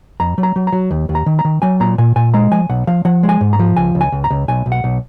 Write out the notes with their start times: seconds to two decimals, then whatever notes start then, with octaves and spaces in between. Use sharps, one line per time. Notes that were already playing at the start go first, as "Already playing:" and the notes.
0.20 F2 A#5
0.38 F#3
0.43 A#5
0.56 F#3
0.67 A#5
0.72 F#3
0.91 D#2
1.09 D#2
1.15 A#5
1.26 D#3
1.39 A#5
1.45 D#3
1.62 F#3 G#5
1.80 A#2 A#5
1.98 A#2 G#5
2.16 A#2 G#5
2.34 G#3 A#5
2.51 F3 G#5
2.69 B1 F#5
2.87 F3 F5
3.05 F3 F#5
3.23 G#3
3.29 G#5
3.41 G#2
3.53 A#5
3.59 F3
3.77 C#2 G#5
3.95 C#2
4.01 G#5
4.12 C#2
4.24 A#5
4.30 C#2
4.48 B1 G#5
4.66 B1
4.72 F#5
4.84 B1